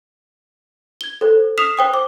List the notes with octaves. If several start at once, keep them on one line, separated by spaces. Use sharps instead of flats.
G#6 G7
A4 C5
D#6 F6 B6 C7 E7 F7
C5 G5 D#6
D6